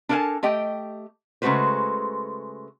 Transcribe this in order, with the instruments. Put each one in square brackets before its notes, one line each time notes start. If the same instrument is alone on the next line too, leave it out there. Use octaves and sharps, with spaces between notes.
[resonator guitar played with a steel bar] D4 A4 A#4 F5 G#5 A5
A3 G4 D#5 G5
C#3 G#3 A3 F#4 B4 C5